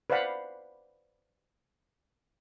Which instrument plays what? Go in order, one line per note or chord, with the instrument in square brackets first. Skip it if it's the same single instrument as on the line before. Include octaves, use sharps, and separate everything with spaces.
[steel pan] B4 C5 D5 F5 F#5 B5